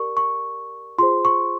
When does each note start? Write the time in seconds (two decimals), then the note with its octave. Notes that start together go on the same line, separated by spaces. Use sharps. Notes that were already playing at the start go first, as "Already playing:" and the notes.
Already playing: G4 A#4 D5 C#6
0.17 C#6
0.98 F4 G#4 C5 C6
1.25 C#6